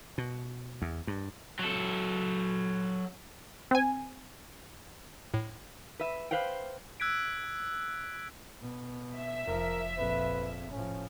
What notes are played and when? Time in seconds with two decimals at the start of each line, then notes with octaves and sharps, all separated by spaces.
0.18 B2
0.82 E2
1.07 G2
1.59 F#3 A4
3.71 C4 G#5
5.34 A2
5.99 B4 E5
6.31 B4 C5 F5 G5
7.00 E6 F#6 G#6 B6 D7
8.60 B2
9.15 E5
9.48 F1 F3 A#4
9.97 A#1 F2 B4
10.71 A2 F3 C#4